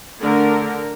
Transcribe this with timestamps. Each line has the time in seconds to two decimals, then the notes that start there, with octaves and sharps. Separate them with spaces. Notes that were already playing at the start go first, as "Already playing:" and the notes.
0.21 D3 A3 A#4